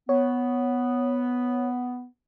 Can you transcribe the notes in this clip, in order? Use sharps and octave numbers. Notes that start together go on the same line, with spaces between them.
B3 C#5